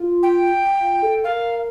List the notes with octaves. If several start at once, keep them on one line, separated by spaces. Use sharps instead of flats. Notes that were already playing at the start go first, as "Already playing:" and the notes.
Already playing: F4
G5
F4
A4
A#4 F5